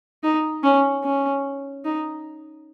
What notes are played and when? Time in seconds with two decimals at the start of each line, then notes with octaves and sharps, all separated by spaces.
0.23 D#4
0.63 C#4
1.04 C#4
1.85 D#4